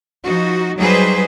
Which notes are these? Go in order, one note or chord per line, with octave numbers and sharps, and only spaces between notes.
F3 D#4 F#4
F#3 G3 D#4 G#4 B4 C5